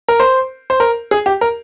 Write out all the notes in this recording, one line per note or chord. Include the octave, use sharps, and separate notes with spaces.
A#4
C5
C5
A#4
G#4
G4
A#4